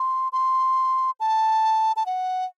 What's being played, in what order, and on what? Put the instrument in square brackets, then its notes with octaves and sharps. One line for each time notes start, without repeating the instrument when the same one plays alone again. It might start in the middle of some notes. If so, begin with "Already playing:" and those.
Already playing: [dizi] C6
C6
A5
A5
F#5